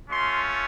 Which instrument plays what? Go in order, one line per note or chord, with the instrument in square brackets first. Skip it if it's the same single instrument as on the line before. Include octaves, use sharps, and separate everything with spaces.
[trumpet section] A3 C#4 F4 C6